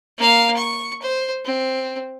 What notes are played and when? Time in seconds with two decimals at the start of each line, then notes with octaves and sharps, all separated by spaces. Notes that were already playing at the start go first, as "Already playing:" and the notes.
0.18 A#3 F5
0.56 C#6
1.02 C5
1.45 C4